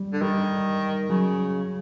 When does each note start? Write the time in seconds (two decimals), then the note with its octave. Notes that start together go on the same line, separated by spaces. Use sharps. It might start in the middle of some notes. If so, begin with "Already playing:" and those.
Already playing: G3
0.13 D3
0.22 D#3 G3
1.10 C#3 F#3